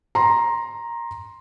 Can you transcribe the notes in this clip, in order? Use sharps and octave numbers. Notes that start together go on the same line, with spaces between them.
A#5 C6